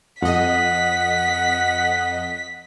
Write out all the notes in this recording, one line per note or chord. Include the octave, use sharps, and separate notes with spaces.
F2 D#5 F#5 B6